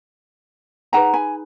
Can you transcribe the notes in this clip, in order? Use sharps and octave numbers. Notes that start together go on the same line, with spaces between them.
D#4 G#4 B4 F#5 A#5
G#5 B5